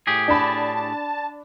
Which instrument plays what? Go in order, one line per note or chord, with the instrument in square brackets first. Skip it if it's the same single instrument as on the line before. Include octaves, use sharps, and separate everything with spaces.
[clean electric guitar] A2 G4 G#4
[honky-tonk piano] D4 B5 [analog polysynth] A5